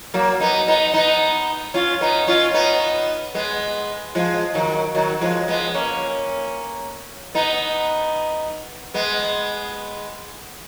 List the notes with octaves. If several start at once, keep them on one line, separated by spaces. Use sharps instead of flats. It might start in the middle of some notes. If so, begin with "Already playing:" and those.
F#3 A#3
B3 D#4
B3 D#4
B3 D#4
C#4 F4
B3 D#4
C#4 F4
B3 D#4
G#3 B3
F3 G#3
D#3 F#3
D#3 F#3
F3 G#3
G#3 B3
A#3 C#4
B3 D#4
G#3 B3